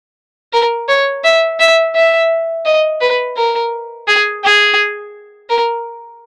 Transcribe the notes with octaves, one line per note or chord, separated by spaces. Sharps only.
A#4
C#5
E5
E5
E5
D#5
B4
A#4
G#4
G#4
A#4